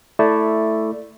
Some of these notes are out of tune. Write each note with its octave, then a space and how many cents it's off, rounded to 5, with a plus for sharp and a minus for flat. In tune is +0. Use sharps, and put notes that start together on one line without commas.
A3 +0 E4 +0 D5 +0